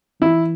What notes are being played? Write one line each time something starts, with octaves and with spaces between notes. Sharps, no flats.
E3 E4